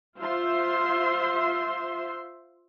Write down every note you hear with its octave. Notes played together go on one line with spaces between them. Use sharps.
F4 C5 E5 C6